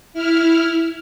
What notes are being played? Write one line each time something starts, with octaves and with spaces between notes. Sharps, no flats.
E4 F6